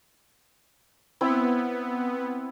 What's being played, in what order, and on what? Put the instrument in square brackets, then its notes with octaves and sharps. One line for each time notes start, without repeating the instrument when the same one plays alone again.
[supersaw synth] B3 [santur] C4 E4